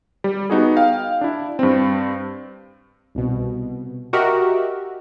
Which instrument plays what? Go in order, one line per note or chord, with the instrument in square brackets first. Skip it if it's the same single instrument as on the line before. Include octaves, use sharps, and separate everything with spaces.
[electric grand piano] G3
B3 D#4 F#4 G#4
F5 G5
D4 E4
G2 C4
[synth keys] C2 B2
F#4 G4 A#4 D#5 E5